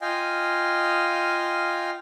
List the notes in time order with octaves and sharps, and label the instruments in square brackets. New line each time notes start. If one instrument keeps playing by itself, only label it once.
[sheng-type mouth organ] F4 D#5 F5 G5 G#5